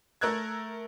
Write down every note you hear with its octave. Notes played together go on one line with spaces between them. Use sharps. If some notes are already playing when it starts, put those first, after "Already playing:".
A3 A#4 E6 F#6 G#6